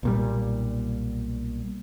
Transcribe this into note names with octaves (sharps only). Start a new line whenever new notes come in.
B1 A#2 G3